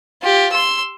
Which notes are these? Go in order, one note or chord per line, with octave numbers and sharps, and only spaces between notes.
F4 G4
C6 E6